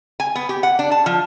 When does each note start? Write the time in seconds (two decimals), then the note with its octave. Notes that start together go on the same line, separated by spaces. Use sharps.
0.20 G#5
0.35 B3
0.49 G4
0.63 F#5
0.79 D4
0.91 A5
1.06 F3